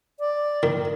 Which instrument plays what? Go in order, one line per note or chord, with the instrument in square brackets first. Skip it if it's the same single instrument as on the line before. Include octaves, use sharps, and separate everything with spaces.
[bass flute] D5
[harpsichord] D#3